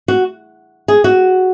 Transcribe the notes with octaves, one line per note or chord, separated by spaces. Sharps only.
F#4
G#4
F#4